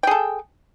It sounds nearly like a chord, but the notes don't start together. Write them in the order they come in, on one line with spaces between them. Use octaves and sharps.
G5 G#4 A4